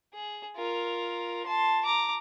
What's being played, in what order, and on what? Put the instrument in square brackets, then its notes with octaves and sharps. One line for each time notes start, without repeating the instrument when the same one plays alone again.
[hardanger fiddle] G#4
F4 A#4
A5 C6
A#5 D6